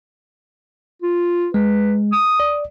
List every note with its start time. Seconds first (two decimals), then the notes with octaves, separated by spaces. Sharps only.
1.02 F4
1.54 G#3 B4
2.12 D#6
2.40 D5